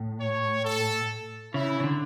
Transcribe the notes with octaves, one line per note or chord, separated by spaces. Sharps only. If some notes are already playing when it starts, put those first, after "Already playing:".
Already playing: A2
C#5
A4
C#3 E4
C#3
D3